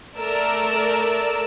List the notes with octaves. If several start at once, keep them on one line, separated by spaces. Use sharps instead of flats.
A3 A#4 D5 E6